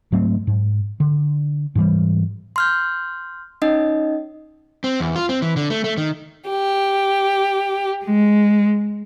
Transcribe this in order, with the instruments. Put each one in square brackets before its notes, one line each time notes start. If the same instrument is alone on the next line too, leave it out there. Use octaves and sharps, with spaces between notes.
[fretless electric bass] G#2 F#3 A3 C4
G#2
D3
G#2 E3 G3
[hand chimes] C6 F6 G6
C#4 D#4 D#5
[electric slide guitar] C4
E2
F4
C4
E3
D3
A3
A3
D#3
[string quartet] G4
G#3